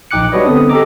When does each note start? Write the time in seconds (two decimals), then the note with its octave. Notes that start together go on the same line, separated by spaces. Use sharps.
0.11 A#1 D#4 G5 D6 F#6 C#7
0.32 G3 D4 F#4 B4 C#5 D#5
0.46 D3 B3 C4 D#6
0.69 G4 A4 D#5 A#5 D6